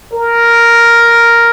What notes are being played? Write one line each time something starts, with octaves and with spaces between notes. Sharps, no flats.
A#4